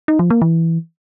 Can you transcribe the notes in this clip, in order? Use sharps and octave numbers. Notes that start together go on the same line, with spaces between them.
D#4
F3
A#3
E3